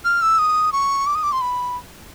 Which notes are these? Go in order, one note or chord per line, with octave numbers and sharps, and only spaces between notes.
F6
E6
D#6
C#6
D6
D#6
D6
C6
B5